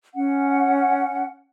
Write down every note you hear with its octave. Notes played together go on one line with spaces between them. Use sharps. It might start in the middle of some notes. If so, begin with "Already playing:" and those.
C#4 F#5